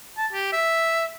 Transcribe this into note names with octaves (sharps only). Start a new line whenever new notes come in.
A5
G4
E5